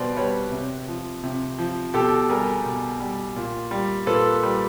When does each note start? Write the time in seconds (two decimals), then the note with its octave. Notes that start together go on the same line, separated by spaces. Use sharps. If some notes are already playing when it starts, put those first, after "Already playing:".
Already playing: B2 G3 B4 C5 D5
0.17 G3 B4 C#5
0.52 C3
0.88 F3
1.23 C3
1.59 F3
1.94 B2 G4 A4
2.29 G3 G#4 A#4
2.66 B2
3.00 G3
3.36 A#2
3.71 G3
4.07 A#2 A4 B4
4.43 G3